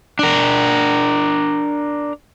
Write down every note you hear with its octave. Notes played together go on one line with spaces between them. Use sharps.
D4 A#4